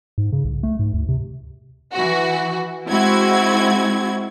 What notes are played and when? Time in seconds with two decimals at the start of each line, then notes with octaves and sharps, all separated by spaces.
0.18 G#2
0.32 C#3
0.45 C2
0.63 A3
0.79 G#2
0.94 D2
1.09 C3
1.92 E3 F#4
2.89 G#3 C4 E4 F#4 G#6